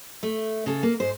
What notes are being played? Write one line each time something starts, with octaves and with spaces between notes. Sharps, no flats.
A3
C#3 A4
A#3
G#2 C5